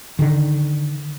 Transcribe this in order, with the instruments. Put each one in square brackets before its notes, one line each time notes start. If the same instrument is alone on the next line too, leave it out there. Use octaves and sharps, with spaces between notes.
[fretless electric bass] D3 D#3